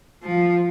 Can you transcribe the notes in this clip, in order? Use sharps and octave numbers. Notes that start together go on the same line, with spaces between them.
F3